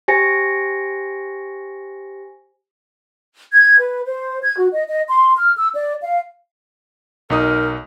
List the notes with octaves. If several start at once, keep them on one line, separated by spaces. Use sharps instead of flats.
G4 C5 G#5 A#6 C#7 D7
G#6
B4
C5
G#6
F#4
D#5
D#5
C6
F6
E6
D5
F5
B1 D#4 A#4 D#6